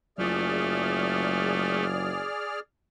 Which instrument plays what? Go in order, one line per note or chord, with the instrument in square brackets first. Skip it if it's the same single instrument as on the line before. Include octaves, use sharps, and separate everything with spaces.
[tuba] F#1 [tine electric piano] F#3 F4 [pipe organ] A3 [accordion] G#4 D5 F6